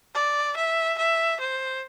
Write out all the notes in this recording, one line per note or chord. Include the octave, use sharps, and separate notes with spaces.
D5
E5
E5
C5